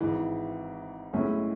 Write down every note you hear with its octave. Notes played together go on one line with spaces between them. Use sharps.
G#1 G#2 E3
B1 A2 G#3 C#4 E4